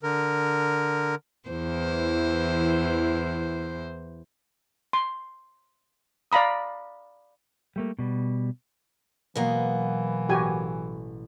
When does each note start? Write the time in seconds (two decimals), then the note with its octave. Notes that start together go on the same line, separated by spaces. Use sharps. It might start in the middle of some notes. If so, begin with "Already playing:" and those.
0.03 D3 A#4
1.50 E2 E3 C5
4.93 C6
6.32 D5 F5 A#5 B5 D#6
7.76 G3 A3 A#3
7.99 B2 G3
9.35 B2 E3 F#3 G#3 A#3 B3
10.29 A1 E4 F#4 G4 G#5